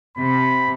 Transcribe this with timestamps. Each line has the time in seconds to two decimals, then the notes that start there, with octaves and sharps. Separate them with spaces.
0.17 C3 B5